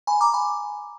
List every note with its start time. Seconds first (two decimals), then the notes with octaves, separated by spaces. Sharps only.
0.07 G#5 B5
0.21 A#5 D6
0.34 G#5 B5